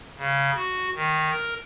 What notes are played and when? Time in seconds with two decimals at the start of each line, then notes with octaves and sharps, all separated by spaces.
0.17 C#3
0.56 F#4
0.95 D#3
1.31 A#4